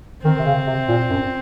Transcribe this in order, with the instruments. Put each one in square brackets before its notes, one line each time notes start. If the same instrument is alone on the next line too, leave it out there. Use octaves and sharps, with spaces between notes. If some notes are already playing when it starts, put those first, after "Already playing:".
[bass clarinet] D#3 [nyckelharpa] C4
[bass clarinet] C3
C#3
C3
A#2
F#2